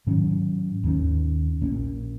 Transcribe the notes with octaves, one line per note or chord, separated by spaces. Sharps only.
G#2 D#3 F#3 C#4
D#2 D#3 F#3 C#4
A#1 A#2 A#3 C#4